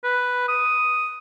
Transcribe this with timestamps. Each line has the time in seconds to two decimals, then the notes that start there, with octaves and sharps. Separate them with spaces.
0.04 B4
0.49 D#6